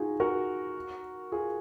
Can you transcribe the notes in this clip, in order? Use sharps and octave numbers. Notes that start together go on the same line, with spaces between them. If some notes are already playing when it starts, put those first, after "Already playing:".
Already playing: D#4 F4 F#4 G#4
F#4 A#4
F4 G#4